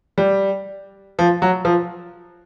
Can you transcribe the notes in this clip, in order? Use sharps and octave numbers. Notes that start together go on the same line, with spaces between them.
G3
F3
F#3
F3